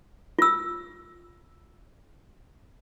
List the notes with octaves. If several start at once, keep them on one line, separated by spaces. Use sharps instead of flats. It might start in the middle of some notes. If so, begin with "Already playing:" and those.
F4 E6